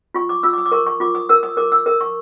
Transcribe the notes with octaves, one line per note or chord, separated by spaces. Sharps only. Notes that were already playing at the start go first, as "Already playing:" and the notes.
F4 C#6
D6
F4 E6
D6
D#6
D6
A#4 C#6
C#6
F4 D6
D#6
A#4 E6
D#6
A#4 D6
E6
A#4 D#6
C#6